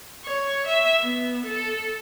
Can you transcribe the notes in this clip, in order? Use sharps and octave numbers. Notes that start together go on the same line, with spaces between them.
C#5
E5
B3
A4